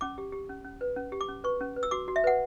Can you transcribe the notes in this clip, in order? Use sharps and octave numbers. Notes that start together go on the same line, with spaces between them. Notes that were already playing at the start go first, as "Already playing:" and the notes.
C#4 D6
G4
G4
C#4
C#4
B4
C#4
G4
D6
C#4
B4 C#6
C#4
B4
E6
F#4 D6
F#4
E5
B4 F#5